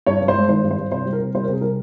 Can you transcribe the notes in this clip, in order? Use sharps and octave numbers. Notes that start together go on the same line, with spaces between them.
G2 C#5
G2
C5
G#3
D#3 C5
G2
C5
G2
C3 C5
G3
A#4
C3
G3 C5
A#4
C3 G#4
G3 A#4